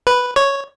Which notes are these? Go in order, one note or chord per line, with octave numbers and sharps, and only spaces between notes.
B4
C#5